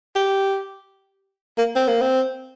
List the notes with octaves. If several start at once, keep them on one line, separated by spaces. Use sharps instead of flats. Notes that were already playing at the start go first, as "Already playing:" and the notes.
G4
A#3
C4
A#3
C4